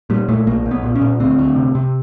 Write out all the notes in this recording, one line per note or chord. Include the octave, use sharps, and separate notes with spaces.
A#2 G3
A#2 A3
B1 A#3
B1
B3
A#2
C#4
A#2
D2 C4
D2
C3
C3